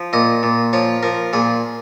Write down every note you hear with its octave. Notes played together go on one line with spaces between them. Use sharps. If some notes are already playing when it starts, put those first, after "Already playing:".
Already playing: F3
A#2 D#5
A#2
F3 C#5
F3 A#4
A#2 G#4